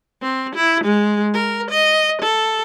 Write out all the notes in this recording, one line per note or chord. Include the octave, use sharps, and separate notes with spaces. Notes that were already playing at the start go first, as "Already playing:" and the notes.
C4
E4
G#3
A#4
D#5
A4